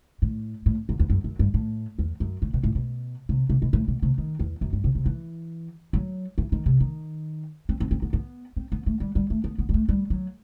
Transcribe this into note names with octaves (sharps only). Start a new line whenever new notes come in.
A2
A2
F#2
E2
F#2
F#2
G2
A2
E2
F#2
A2
B2
A2
B2
C3
C3
B2
A2
B2
C3
D#3
E2
F#2
G2
C3
C3
E3
F#3
E3
D#3
C3
D#3
C4
C4
C4
B3
B3
C4
B3
A3
G3
G3
A3
B3
B3
G3
A3
G3
F#3